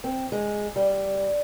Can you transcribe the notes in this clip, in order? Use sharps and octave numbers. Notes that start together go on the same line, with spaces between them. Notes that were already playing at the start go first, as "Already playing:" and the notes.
C4
G#3
G3